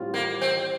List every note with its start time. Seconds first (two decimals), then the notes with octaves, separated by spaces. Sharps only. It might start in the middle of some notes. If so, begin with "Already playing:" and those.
Already playing: A2 G3 C4 F4
0.14 A#3
0.41 C4